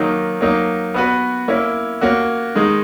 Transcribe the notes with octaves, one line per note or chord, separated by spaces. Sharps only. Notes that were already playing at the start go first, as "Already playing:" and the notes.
Already playing: D#3 F#3 A#3 D#4
F#3 A#3 D#4
B3 F#4 B4
A#3 C#4 E4
A#3 C#4 F#4
D#3 G#3 D#4